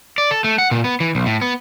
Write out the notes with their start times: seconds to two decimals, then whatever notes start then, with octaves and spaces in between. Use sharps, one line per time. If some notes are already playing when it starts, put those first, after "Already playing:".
0.18 D5
0.31 A4
0.44 A3
0.58 F#5
0.71 A#2
0.84 B3
1.00 E3
1.15 B1
1.26 A2
1.42 B3